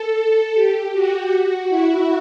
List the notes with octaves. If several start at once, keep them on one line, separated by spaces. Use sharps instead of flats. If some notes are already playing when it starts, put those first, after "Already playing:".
Already playing: A4
A4
G4
F#4
E4